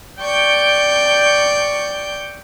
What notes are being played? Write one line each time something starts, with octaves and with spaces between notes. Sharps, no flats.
D5 G5 C#6 G6